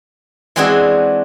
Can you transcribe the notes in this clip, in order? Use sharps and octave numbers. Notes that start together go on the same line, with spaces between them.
E3 G#3 C4 D4 F#4 G#4